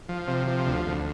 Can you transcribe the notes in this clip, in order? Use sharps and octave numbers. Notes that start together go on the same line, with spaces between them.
F3
C3
F3
D2
D2